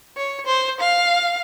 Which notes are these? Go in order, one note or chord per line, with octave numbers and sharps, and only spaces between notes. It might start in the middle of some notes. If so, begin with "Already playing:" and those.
C#5
C5
F5